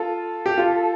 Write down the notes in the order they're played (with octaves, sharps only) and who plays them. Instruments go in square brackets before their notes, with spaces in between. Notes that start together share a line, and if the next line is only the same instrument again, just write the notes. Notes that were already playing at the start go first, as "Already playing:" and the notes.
Already playing: [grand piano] F4 [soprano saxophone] A4
[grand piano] G4
F4